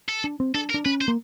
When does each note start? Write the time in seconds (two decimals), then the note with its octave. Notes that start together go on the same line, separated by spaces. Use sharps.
0.08 A4
0.24 D4
0.40 C4
0.54 D4 A4
0.70 A#4
0.74 D4
0.85 C#4 B4
1.01 C5
1.08 A#3